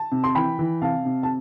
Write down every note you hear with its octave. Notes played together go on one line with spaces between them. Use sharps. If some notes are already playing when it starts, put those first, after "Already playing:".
Already playing: A5
C3
C6
E3 G5 B5
E3
C3 F5 A5
C3
A5